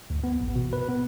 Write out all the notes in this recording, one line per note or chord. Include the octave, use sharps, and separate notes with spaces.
D2
B3
A1
B2
B4
B3